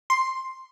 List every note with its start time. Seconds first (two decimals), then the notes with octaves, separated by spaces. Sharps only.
0.10 C6